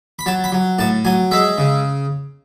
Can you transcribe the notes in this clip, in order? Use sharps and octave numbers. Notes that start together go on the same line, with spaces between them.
B5
F#3 A5
B5
F#3
A2 A5
F#3 G#5
G#3 E5
C#3